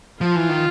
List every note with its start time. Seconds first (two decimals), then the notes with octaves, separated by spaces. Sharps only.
0.20 F3 F4
0.35 E3
0.50 D#3